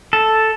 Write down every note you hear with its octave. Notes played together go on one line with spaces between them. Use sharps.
A4